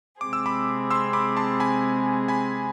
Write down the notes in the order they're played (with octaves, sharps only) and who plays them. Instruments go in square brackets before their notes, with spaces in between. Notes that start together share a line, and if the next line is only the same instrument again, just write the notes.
[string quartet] C3 G#3 C4 G#4 [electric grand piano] D6
[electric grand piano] E6
B5 D6
C6 E6
B5 D6
A5 C6
G#5 B5
G#5 B5